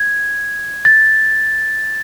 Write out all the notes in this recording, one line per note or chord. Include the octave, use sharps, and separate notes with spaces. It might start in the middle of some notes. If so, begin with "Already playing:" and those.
Already playing: G#6
A6